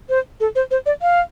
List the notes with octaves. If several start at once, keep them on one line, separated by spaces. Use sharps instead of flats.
C5
A4
C5
C5
D5
F5